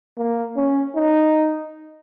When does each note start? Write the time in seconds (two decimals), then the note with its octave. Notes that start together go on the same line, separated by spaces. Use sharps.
0.18 A#3
0.57 C#4
0.95 D#4